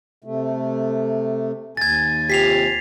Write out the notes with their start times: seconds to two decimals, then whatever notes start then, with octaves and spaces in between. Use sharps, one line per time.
0.24 C3 A3
1.77 D#2 G#5 G#6 A6
2.30 C3 F4 G4 B6 C7 F7